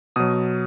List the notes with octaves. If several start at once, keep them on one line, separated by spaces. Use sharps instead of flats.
B2 F#3 D#6